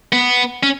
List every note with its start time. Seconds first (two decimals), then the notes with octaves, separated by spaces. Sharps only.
0.13 B3
0.63 C#4